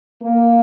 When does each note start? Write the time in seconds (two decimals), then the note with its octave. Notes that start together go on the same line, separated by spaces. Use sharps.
0.23 A#3